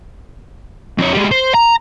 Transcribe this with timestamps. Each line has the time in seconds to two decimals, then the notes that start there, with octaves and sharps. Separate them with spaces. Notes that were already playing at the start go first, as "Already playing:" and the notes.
0.98 F2 C#5
1.13 G3 G#3
1.31 C5
1.54 A#5